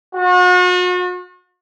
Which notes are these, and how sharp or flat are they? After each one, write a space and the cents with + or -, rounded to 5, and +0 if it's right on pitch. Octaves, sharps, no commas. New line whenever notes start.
F#4 -40